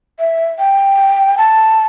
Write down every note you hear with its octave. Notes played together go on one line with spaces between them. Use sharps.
E5
G5
A5